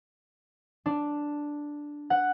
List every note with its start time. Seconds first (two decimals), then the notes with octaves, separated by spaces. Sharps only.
0.86 D4
2.10 F#5